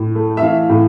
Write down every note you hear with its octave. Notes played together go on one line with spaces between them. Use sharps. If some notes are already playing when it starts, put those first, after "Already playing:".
Already playing: A2
A3
E5
E3 F5
A2